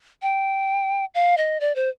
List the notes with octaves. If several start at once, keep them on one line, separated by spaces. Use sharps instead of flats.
G5
F5
D#5
D5
C5